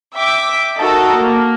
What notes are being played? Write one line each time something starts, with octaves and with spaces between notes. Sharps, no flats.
E5 G5 D6
D#4 F#4 A4 A#4
A#3